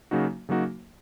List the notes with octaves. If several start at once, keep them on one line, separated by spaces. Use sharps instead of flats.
C#3 F#3 A#3 D#4 F#4
C#3 F#3 A#3 D#4 F#4